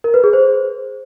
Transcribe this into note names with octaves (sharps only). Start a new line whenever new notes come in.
A#4
B4
G#4
C5